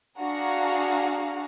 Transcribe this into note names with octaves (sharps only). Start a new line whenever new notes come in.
D4 F#4 G#4 F5 F#5 A#5